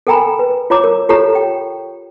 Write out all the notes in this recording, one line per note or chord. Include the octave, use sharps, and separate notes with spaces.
A4 A#4 G5 G#5 A#5 B5
B4
F4 C#5 A#5 D6
A#4
F4 G4 A4 C#5 A#5
G5